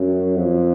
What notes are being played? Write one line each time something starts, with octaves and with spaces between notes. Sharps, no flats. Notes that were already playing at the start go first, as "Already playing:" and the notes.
Already playing: F#2
F2